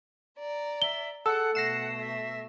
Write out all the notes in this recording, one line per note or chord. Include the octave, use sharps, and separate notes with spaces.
D5 A#5
E5 G7
G#4 A4 F#5 E6
B2 A3 F#5 A#6 C7 E7
E5